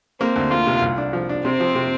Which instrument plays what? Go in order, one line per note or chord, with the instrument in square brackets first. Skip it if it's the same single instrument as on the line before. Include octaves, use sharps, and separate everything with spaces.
[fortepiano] A#3 [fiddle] C4
[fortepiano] D2
[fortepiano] A#3 [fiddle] F4
[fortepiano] C3
C2
D4
F3
D4
[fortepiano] C3 [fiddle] C4
[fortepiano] F3
C3